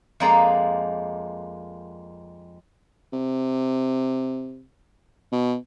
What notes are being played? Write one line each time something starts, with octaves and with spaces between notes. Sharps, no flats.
F2 G#3 A#3 D#4 D5 A#5
C3
B2